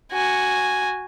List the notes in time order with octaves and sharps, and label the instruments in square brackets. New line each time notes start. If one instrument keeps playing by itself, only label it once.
[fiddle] F#4 G#5